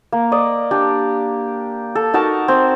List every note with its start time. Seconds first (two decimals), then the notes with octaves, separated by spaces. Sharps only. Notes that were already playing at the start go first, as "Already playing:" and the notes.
0.12 A#3
0.32 D5 D#5 D#6
0.71 D4 G4
1.95 A4
2.14 D#4 F#4 A#4 A5
2.48 C4